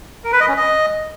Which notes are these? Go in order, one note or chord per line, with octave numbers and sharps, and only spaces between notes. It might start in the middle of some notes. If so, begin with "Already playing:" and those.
A#4
B4
D#5
C#4
D#5